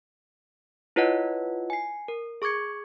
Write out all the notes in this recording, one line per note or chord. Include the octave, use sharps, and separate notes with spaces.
E4 F4 B4 C#5 D#5 F#5
G#5 C7
A#4
G#4 C#6 D6 G#6 C#7